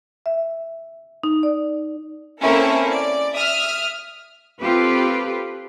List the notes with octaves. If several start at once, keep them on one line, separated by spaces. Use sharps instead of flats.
E5
D#4
D5
A#3 C4 C#4 E4 A4 A#4
D5
E5 D#6 F6
C4 F4 G4 A4 B4